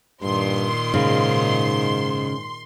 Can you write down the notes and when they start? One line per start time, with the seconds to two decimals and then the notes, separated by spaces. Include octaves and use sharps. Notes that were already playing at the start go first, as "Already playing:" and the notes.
0.22 G2 A#2 D#3 C6
0.94 G#2 C#3